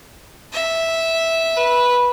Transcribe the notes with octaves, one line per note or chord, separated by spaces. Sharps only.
E5
B4